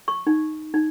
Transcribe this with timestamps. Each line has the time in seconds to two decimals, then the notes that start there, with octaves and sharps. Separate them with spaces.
0.08 C#6
0.27 D#4
0.74 D#4